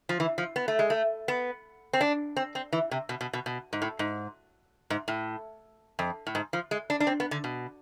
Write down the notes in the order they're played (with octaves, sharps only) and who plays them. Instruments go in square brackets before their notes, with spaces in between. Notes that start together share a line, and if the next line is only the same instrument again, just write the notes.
[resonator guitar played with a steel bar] F3
E3
F3
B3
A3
G#3
A3
B3
C4
D4
C4
C4
E3
C3
B2
B2
B2
B2
G#2
A2
G#2
G#2
A2
F2
A2
G#2
F3
G#3
D4
D4
C4
B3
D3
B2